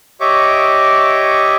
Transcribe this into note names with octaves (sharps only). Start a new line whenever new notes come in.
G4 C#5 D#5 E5 C#6 D6